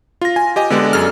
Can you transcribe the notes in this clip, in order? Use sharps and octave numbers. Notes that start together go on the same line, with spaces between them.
F4 A#6
G#5
G4 D#5 G#5
D3 G#3 B3 D4 G4 D5
F#2 G#4 A4 F6